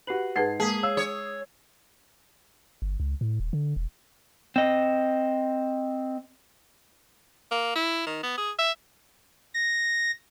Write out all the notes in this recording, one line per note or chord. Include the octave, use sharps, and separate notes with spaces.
F#4 G4 B4 C7 F#7
G#2 G#4 B4 F#5 A5 G#6 A6 C7
G#3 A#3 G#4 A5 B6
C#5 F5 E6
C#5 D#6
G1
C#2
A2
D#1
D3
E1
C4 D#5
A#3
E4
D#3
B3
G#4
E5
A#6